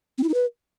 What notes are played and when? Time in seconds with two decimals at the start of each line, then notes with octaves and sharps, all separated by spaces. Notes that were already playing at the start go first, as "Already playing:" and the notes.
0.18 C4
0.23 E4
0.29 D#4
0.34 B4